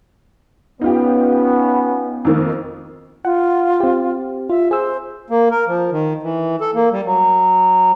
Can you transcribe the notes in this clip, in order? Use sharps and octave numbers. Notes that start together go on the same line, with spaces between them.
B3 C#4 D#4 F4 G4
F2 D#3 A#3
F4 F#5
C4 G4
F4 E5
G#4 C5 E6
A#3
A#4
F3
D#3
E3
A4
A#3
G3
F#3